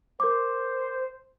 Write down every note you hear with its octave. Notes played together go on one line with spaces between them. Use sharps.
A#4 C5 D6